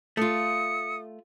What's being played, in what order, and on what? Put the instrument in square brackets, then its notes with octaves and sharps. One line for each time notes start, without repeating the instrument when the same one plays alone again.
[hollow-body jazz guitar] A3 F4 [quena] D#6 [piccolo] C#7